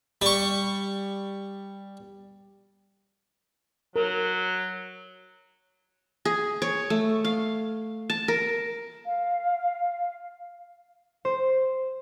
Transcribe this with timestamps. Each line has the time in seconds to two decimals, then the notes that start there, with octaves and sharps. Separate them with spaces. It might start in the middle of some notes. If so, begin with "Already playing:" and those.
0.22 G3 C#6
3.96 F#3 A#4
6.25 G#4
6.62 C#5
6.90 A3
7.25 F5
8.10 A5
8.28 A#4
9.06 F5
11.25 C5